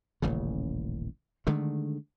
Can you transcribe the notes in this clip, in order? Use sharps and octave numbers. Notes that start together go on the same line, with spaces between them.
D#1 A1 C#3
D3 D#3 G#3 A3